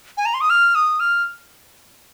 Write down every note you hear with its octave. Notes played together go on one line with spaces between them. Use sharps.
G#5
A#5
C6
D#6
F6
D#6
F6